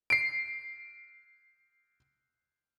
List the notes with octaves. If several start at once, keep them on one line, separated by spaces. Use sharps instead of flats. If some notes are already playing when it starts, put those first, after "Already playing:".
C7 D7